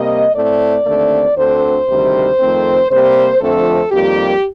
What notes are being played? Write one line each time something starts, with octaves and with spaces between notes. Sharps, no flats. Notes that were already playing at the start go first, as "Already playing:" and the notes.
Already playing: C3 G3 A#3 D#5
A2 A3 C4 D5
D#2 D3 A3 C4
D2 D3 A3 C4 C5
D2 C3 D#3 G3
F2 D#3 A3 C4
C3 G3 A#3 C5
F2 D3 F3 A3 C4 A4
F2 D#3 G3 A#3 G4